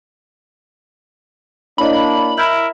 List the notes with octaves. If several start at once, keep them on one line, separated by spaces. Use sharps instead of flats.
A#3 D4 E4 C#5 D#5 B5
E4 A#4 E5 G6 G#6